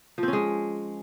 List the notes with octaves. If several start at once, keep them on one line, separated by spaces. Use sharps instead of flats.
F3
C4
C#4
G#3